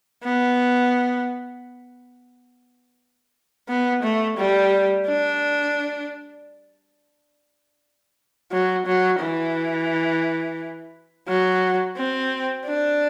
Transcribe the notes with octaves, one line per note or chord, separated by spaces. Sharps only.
B3
B3
A3
G3
D4
F#3
F#3
E3
F#3
C4
D4